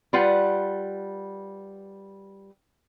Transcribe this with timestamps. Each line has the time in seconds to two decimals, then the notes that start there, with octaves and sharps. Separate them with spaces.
0.13 G3 F4 B4 F#5